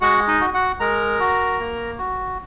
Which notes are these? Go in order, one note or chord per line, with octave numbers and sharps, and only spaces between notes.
G#3 F#4 F#5
D#4 D#5
F#4
F#4 F#5
G#3 A#4 A#5
F#4
A#3
F#4